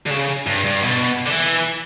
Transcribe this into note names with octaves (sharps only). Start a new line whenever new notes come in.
D3
C#3
G2
G2
B2
D3
E3